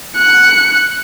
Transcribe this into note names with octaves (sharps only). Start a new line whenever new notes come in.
F#6 C#7